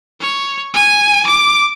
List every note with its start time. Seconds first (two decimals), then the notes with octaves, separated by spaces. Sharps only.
0.20 C#5
0.74 G#5
1.27 D6